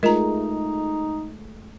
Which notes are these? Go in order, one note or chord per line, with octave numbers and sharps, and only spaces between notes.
G#3 A3 D#4 F4 A#4 D#5 A#5